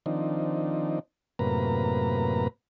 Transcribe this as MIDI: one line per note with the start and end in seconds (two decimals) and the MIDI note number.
0.06 0.99 51
0.06 0.99 53
0.06 0.99 60
0.06 0.99 62
0.06 0.99 63
1.39 2.48 42
1.39 2.48 45
1.39 2.48 48
1.39 2.48 58
1.39 2.48 71
1.39 2.48 82